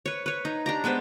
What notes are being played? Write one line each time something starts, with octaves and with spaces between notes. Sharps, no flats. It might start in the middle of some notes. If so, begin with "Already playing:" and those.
B4 C#5
B4 C#5
D#4
D4 G4 A#5
G#3 B3 B4 C5